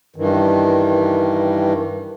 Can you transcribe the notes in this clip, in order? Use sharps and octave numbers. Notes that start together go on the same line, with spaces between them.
G2 D#3 E3